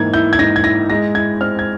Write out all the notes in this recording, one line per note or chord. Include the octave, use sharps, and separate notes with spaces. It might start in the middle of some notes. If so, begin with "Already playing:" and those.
Already playing: G#2 E3 A#3 G#6
E4 G6
G#6
G#2 A#6
G#6
E4 A#6
G#3 A#6
E4 G#6
C4 F6
G#6